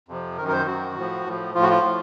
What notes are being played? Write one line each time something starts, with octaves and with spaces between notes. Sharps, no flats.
F2 C3 F3
F#2 D#3 A#4
A#4
C5
F#2 D#3 F#4
A2 F3
A2 F3
A2 F3 F4
F#4
F4
A2